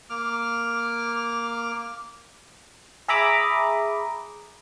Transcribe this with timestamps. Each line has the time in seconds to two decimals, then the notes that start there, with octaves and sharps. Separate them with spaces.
0.10 A#3 D6 F6
3.08 G#4 E5 A#5 B5 D6 D#6